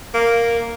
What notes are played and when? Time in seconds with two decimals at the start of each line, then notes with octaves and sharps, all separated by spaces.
0.14 A#3